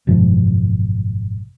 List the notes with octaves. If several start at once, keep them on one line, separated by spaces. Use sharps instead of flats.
G#1 F#2 B2 F3